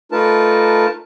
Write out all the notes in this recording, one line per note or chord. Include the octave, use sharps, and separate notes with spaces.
A3 D#4 F4 A#4 B4 A5